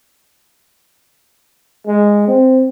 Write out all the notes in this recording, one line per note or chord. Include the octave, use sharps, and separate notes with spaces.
G#3
C4